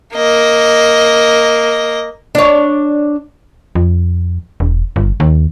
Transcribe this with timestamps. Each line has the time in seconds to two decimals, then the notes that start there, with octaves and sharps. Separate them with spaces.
0.15 A#3 D#5
2.35 D4 C#5
3.75 F2
4.60 E1
4.96 G1
5.20 D#2